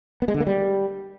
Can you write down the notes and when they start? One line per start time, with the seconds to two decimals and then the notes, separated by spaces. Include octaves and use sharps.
0.22 B3
0.28 G#3
0.34 D3
0.40 A#3
0.47 G3